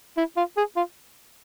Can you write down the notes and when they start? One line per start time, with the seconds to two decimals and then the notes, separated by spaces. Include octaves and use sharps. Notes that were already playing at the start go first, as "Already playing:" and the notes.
0.17 E4
0.37 F4
0.57 G#4
0.76 F4